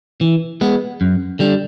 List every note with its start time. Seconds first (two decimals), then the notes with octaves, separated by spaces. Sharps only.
0.21 E3
0.61 G#3 B3
1.01 F#2
1.39 D3 G3